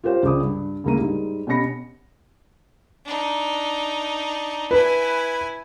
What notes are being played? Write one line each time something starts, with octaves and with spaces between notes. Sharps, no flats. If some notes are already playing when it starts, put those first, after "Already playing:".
F4 G4 A#4 C5 C#5 F5
C#2 D4 D6 D#6
G2
D2 A2 C#3 A#3 A#5 D#7
G#2 G3
B2 C#4 G4 B5 A#6 C#7
D4 D#4
E4 B4 G#5